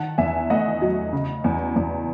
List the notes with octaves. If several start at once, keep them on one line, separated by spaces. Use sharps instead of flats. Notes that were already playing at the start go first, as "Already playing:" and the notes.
Already playing: D#3 F#5 A5
E2 E5 G#5
A3 D#5 F#5
F#3
C#3
E2
E2